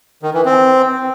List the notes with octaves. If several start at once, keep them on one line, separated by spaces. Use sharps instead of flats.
D#3
E3
C4